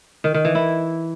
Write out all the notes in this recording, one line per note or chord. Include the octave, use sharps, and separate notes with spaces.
D#3
D#3
E3
E4